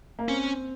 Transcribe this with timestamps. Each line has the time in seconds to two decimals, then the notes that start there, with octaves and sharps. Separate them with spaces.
0.19 A#3
0.28 C4 C#4